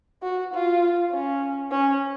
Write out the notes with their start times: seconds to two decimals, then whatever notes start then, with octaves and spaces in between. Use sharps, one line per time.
0.22 F#4
0.53 F4
1.12 C#4
1.71 C#4